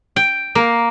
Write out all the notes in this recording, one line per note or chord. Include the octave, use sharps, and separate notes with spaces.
G5
A#3